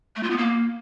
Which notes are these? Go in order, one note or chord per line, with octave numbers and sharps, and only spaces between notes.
A3
F4
B3
A#3